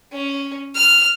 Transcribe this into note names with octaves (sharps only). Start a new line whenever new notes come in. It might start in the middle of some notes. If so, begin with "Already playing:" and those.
C#4
F6